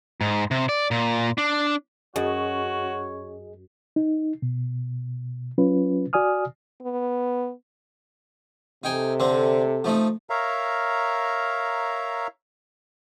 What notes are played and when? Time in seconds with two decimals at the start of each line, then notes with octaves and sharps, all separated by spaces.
0.21 G#2
0.51 C3
0.69 D5
0.91 A#2
1.38 D4
2.16 F#2 F#4 G#4 C#5 D#5
3.96 D#4
4.42 B2
5.58 F#3 C#4 F4 B4
6.13 F#4 D5 G#5 D#6 F6
6.82 B3
8.84 C3 D#4 A4 G5 G#5
9.20 D3 C4
9.84 F3 A3 D#4
10.30 A#4 C#5 E5 F5 A#5